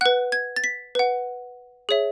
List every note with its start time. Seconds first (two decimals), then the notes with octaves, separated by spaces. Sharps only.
0.01 F#5 F#6
0.06 B4
0.32 G#6
0.56 A6
0.64 B6
0.95 B4 F#5
1.89 G#4 C#5 E5